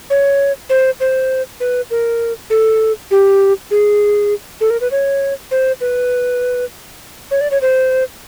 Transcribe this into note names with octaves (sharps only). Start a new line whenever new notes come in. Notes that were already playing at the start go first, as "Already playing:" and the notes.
C#5
C5
C5
B4
A#4
A4
G4
G#4
A4
A#4
B4
C#5
C5
B4
C#5
D5
C#5
C5